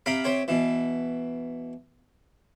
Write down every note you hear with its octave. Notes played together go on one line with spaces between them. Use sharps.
C3 F5 G5 A#5 B5
C3 C5 C#5 G5
B2 E3